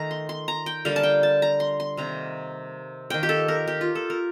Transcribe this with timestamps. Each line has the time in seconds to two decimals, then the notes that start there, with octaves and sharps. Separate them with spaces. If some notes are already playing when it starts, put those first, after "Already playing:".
Already playing: D#3 A3 A#5
0.11 C6
0.29 C6
0.48 A#5
0.66 G5
0.85 D3 G3 A#3 F5
0.96 A5
1.03 G5
1.23 A5
1.42 A#5
1.60 C6
1.80 C6
1.97 C3 D#3 A#3 A#5
3.10 D#3 A#3 G5
3.23 G4
3.29 A4
3.48 A#4
3.68 G4
3.81 F4
3.95 A4
4.10 A#4